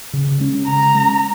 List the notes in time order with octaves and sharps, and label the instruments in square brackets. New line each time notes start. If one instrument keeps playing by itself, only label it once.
[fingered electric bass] C#3
G#3 C#4
[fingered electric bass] C#3 [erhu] A#5
[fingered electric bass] G#3 C#4